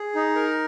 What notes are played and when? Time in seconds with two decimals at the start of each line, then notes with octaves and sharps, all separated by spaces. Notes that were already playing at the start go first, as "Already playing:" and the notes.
Already playing: G#4
0.15 D#4
0.35 A#4